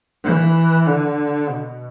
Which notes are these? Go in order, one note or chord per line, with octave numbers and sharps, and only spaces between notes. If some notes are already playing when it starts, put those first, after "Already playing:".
E3
D3
B2